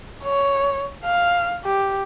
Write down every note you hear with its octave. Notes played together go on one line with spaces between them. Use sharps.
C#5
F5
G4